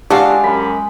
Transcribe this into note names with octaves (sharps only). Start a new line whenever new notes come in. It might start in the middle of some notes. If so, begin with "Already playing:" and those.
G#3 D4 F#4 G4 A4 F5
F#2 B5